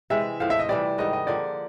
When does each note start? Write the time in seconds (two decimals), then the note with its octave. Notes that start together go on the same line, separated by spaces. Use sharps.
0.10 C3 E3 G#3 E5
0.40 A2 F3 A3 F5
0.50 E5
0.59 D#5
0.69 C3 E3 G3 D5
0.98 G#2 D#3 G3 D#5
1.13 D#5
1.27 D3 F3 A#3 D5